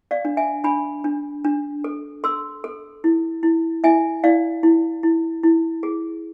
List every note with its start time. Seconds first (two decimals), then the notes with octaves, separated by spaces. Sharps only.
0.11 D5 F5
0.25 D4
0.37 E5 G#5
0.64 D4 G#5 B5
1.04 D4
1.44 D4
1.84 A4
2.24 A4 C6 E6
2.64 A4
3.04 E4
3.43 E4
3.84 E4 E5 G#5
4.24 E4 D5 F5
4.63 E4
5.03 E4
5.43 E4
5.83 G#4